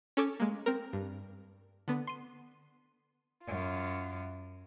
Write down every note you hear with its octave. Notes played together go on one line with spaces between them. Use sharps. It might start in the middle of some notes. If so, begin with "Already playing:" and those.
C#4 A4 D6 G#6
G#3 A#3
C4 A#4
G2
D3 B3
C6 D#7
F#2 F4